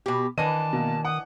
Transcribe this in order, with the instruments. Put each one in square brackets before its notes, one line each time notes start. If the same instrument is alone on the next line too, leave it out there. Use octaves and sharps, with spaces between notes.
[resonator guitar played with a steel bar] B2 G4
[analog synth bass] D#3 [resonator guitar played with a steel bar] E3 D4 D#5 [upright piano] B4 D#7 [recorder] A5
[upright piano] B2 A#3
[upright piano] F#5 [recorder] D#6